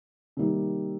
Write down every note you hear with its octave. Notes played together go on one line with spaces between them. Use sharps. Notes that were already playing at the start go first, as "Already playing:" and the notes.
C3 D#3 G3 A#3